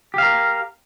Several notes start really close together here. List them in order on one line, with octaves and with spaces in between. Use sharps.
G4 F5 A#4